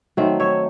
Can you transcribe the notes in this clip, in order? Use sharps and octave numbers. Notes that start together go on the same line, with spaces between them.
D#3 F#3 A3 C4
C#5 E5